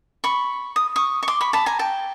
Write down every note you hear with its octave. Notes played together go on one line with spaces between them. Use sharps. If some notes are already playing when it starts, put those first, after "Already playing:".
B5 C#6
D#6
C#6 D#6
C#6
C6 D6
B5 C#6
A5 B5
G#5 A#5
G5 A5